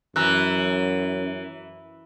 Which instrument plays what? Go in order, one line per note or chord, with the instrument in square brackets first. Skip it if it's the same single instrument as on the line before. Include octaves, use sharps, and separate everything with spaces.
[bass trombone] F#2 [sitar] E3 [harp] A#5 E6 F#6